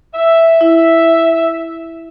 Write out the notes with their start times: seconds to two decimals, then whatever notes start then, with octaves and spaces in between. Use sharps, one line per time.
0.15 E5
0.61 E4